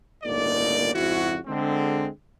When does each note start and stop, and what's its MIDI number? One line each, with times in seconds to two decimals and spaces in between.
0.24 0.89 31
0.24 0.89 37
0.24 0.89 45
0.24 0.89 58
0.24 0.89 63
0.24 0.89 74
0.94 1.37 41
0.94 1.37 44
0.94 1.37 49
0.94 1.37 64
0.94 1.37 66
1.47 2.07 50
1.47 2.07 56
1.47 2.07 60